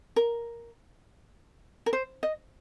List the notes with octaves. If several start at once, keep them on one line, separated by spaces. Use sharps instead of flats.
A#4
A#4
C5
D#5